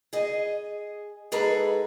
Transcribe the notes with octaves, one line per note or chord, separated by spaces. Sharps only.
G#4 D#5
G#2 G#4 A4 B4 A#5